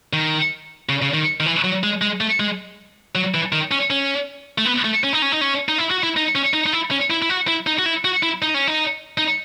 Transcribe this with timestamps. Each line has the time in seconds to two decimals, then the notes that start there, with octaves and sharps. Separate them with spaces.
0.13 D#3
0.89 C#3
1.02 C#3
1.14 D#3
1.40 D#3
1.46 E3
1.64 F#3
1.83 G#3
2.01 G#3
2.21 A3
2.40 G#3
3.15 F#3
3.34 E3
3.52 D#3
3.71 C#4
3.90 C#4
4.58 A3
4.65 B3
4.85 A3
5.04 C#4
5.13 D#4
5.22 C#4
5.32 D#4
5.41 C#4
5.69 D#4
5.78 E4
5.91 F#4
6.03 E4
6.17 D#4
6.35 C#4
6.54 D#4
6.66 D#4
6.73 E4
6.91 C#4
7.10 E4
7.22 E4
7.29 F#4
7.48 E4
7.67 D#4
7.79 F#4
7.86 E4
8.05 F#4
8.23 E4
8.42 D#4
8.54 C#4
8.67 D#4
9.18 D#4